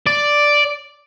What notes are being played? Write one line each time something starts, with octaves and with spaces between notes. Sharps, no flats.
D5